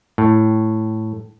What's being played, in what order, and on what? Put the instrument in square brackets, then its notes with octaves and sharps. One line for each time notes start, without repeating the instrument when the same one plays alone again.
[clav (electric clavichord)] A2